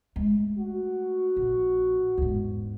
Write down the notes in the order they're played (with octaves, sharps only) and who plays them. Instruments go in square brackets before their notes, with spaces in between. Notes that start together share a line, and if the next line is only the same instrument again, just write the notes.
[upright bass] G#3 A3
[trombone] F#4
[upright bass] A#1
E2 G#2